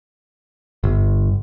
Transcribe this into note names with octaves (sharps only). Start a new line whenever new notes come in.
G1